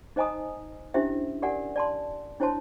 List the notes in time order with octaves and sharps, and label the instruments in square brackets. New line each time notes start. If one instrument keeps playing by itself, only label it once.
[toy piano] D#4 C5 D#5 G#5 A#5 D#6
C#4 D4 E4 G4 C5 E5
G4 A#4 D5 F#5 G#5
D5 A5 C6
D4 E4 C5 C#5 A5 C6